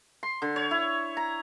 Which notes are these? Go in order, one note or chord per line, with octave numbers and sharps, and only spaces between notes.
C6
D3
C#5
E4
A#5